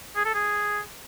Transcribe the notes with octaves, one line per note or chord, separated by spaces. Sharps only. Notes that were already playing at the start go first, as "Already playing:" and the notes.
G#4
A4
G#4